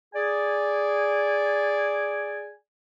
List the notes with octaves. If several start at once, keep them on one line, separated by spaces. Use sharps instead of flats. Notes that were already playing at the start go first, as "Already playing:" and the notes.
G#4 D5 G#5